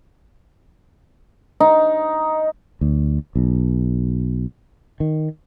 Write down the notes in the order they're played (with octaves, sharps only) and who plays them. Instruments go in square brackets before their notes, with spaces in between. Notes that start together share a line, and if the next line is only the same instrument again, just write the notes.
[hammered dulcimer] D#4
[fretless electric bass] D2
B1
D#3